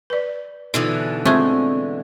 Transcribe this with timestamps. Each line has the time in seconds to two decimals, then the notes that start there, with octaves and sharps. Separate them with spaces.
0.10 B4 D5
0.74 B2 D3 E3 D#4 F4
1.25 G#3 A3 C4 F4